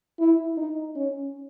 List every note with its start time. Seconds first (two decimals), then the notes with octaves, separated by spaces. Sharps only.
0.19 E4
0.57 D#4
0.95 C#4